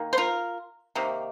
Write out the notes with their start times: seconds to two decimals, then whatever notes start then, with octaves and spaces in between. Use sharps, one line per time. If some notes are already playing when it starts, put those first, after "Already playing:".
Already playing: D#3 A#3
0.13 C5
0.18 F4 A#4
0.95 C3 D#3 A#3